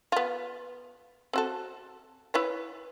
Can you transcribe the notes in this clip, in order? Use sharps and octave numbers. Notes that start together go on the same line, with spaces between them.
B3 F4
C4 F#4 A4
E4 B4 C#5